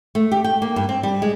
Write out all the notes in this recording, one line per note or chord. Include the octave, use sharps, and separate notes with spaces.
A3
G4
G5
A#3
G2
C4
G3
G#3